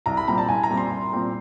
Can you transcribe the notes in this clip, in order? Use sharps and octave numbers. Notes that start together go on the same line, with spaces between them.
C2 A#5
B5
A#2 G3 C4 A#5
A5
C2 G#5
A#5
A#2 G3 C4
C6
C2
A#2 G3 C4